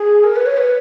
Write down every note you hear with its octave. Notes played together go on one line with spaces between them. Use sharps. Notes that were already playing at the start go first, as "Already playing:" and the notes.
Already playing: G#4
A#4
B4
C#5
B4